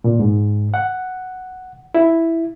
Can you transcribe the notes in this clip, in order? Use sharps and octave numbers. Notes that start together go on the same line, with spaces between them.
A#2
G#2
F#5
E4